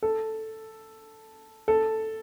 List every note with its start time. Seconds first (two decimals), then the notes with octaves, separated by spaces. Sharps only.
0.03 A4
1.68 A4